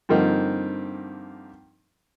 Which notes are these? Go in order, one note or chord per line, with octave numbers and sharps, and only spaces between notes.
G2 D3 F3 A#3 C4 D#4